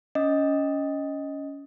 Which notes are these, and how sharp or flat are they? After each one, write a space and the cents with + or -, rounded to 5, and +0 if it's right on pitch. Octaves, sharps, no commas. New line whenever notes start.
C#4 +20 D#5 +10